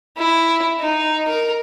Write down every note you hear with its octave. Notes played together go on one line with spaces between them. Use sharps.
E4
D#4
A#4